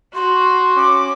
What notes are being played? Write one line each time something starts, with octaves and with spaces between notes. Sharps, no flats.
F#4 C6
C#4 D6